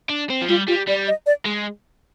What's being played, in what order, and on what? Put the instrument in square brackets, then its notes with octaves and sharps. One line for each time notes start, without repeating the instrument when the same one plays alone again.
[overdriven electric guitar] D4
C4
F3
[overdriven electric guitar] G3 [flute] F4
[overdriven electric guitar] G3 [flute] F4
[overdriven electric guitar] G3 [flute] D5
[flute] D#5
D5
[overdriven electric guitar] G#3